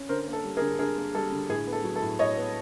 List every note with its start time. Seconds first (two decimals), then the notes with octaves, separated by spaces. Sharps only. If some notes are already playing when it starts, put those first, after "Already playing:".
Already playing: C#4
0.09 D3 A#4 C5
0.27 A#3
0.33 A4
0.44 G3
0.57 G#4 A#4
0.62 D3
0.79 D3 G#4 A#4
0.97 A#3
1.15 G3 A4
1.32 D3
1.49 A2 G#4
1.67 B3
1.73 A4
1.84 F#3
1.96 A4
2.02 A2
2.19 A2 C#5 D#5
2.37 B3